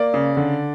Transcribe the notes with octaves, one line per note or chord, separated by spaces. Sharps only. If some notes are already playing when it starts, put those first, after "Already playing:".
Already playing: A#3 D5
C#3
D3